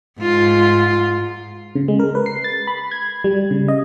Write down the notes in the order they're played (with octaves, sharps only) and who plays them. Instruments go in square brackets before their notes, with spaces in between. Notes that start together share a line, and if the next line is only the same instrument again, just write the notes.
[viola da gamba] G#2 F4
[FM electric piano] C#3
G#3
A#4
B4
C7
A6
B5
G#6
G3
C#3
D#5